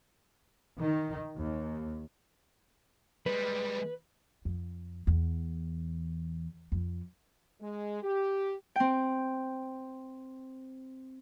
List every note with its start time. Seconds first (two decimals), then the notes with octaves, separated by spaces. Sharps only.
0.79 D#3
1.36 D#2
3.26 G3 G#3 B4
4.45 F2
5.07 E2
6.72 F2
7.61 G#3
8.03 G4
8.76 C4 G5